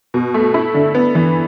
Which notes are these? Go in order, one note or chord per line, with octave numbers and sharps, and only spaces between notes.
B2
A3
E4
D3
B3
E3